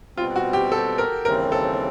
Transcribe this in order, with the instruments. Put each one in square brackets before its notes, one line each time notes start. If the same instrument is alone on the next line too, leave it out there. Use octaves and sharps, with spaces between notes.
[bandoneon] B2 G3 C4 [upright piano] F4
[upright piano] F#4
G4
A4
A#4
[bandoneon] D#2 C#3 E3 G3 C4 [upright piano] A#4
[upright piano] A4